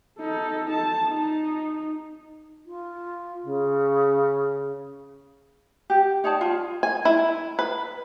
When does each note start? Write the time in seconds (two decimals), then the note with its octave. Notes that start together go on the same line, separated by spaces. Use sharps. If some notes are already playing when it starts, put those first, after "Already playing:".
0.19 D#4 A4
0.70 A5
1.05 D#4
2.66 F4
3.43 C#3
5.90 G4
6.24 D#4 C#5 D5 A5
6.41 F4
6.83 G#5
7.05 E4
7.59 B4